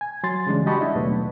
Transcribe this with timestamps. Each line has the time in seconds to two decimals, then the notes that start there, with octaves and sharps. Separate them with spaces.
0.01 G#5
0.23 F#3 C6 A6
0.47 C#3 E3 G3 G#3 D4
0.66 F#4 G4 D#5 A5 B5 C#6
0.81 D4 E4
0.95 D#2 B2 F#3 A3 B3